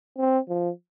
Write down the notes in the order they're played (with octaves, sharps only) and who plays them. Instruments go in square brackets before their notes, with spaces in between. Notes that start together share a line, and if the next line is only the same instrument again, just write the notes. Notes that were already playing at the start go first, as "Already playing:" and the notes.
[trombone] C4
F3